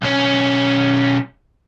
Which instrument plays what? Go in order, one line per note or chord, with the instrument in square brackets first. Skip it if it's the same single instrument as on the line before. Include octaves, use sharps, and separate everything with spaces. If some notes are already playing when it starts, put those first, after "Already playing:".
[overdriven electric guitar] B1 C#4